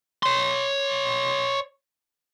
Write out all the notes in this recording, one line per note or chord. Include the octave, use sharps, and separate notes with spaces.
C#5 C6